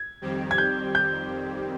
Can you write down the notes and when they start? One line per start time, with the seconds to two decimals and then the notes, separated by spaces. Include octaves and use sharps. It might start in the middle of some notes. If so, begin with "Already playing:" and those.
Already playing: G#6
0.22 F2 D#3 G3 C4 G4
0.51 G#6
0.58 G6
0.95 G6